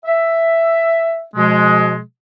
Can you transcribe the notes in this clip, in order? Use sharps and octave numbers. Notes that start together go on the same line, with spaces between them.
E5
B2 F3 G#3